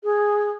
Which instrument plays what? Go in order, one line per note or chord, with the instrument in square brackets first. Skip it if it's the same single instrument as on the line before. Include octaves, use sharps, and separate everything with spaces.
[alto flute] G#4